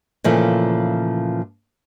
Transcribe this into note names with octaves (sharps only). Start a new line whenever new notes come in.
A#2 C#3 E3 F3 A3